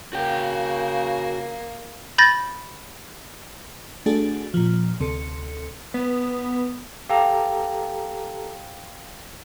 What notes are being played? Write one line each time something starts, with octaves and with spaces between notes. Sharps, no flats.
C#3 A#3 F#4 G5
B5 G6 A6 A#6
A3 D4 F#4 G#4 A4
A#2 F3
D2 C3 A4 C#7
B3
G4 A4 F5 G5 A#5